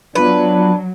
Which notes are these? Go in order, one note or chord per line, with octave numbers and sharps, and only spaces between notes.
F#3 B3 D4 F4 B4 D5